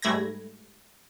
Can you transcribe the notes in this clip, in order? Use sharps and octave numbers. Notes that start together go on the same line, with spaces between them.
G#2 G3 A3 B5 G#6 A#6